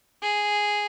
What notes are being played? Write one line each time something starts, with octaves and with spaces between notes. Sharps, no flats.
G#4